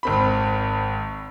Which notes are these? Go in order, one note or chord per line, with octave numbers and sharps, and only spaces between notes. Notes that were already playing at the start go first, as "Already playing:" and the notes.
G#1 C4 B5